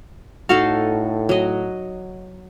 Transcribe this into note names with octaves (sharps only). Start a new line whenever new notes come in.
A2 D#4 F#4 A4 F5
F#3 D#5